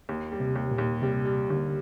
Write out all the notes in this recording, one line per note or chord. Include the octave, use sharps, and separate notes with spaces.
D#2
G3
C3
D#2
A#2
D#2
C3 G3
G3
D#2 D3